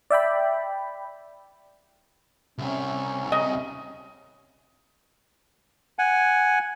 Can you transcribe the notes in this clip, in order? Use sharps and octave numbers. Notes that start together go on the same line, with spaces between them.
D5 E5 G5 B5
C2 C3 C#4
D#5
F#5 G#5